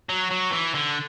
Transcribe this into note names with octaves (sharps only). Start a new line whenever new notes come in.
F#3
F#3
E3
D3